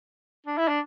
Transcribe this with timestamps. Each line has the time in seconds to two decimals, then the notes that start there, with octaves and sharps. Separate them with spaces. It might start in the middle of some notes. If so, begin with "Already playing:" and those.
0.46 D4
0.57 E4
0.68 D4